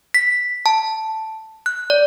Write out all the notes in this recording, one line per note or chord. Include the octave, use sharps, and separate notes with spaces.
B6
A5
F#6
D5